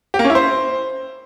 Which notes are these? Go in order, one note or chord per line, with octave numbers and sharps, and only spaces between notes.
G4
A#3
C#4
E4
C5